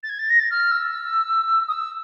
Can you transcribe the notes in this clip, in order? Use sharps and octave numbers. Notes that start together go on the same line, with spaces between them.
A6
G#6
A6
A#6
A6
F6
E6
D#6
E6